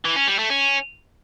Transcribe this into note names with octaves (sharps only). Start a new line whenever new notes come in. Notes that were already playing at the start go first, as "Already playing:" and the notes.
E3
C#4
G3
A3
C#4